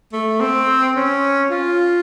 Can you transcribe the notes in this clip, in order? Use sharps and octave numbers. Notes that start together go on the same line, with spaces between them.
A3
C4
C#4
F4